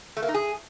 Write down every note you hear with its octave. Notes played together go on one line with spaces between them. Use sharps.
A3
A#3
D#4
G#4